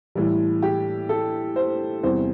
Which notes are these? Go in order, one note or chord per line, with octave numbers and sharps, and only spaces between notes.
A2 E3 G3
G4
A4
C5
E2 C3 E3 G3 C5